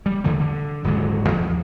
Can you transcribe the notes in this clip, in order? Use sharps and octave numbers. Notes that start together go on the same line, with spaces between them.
G3
E2 D3 E3 A3
D3
D#1 G#2 D3 F#3
A1 E2 F3